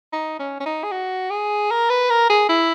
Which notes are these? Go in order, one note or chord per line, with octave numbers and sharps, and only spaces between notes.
D#4
C#4
C#4
D#4
G#4
F#4
G#4
A#4
B4
A#4
G#4
E4